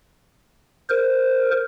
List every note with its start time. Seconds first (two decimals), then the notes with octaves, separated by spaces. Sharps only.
0.89 A#4 C5